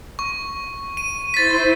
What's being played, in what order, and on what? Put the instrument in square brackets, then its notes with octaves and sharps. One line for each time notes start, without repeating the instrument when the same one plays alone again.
[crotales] C#6
D#7
[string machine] E4 C5 [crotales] A6 B6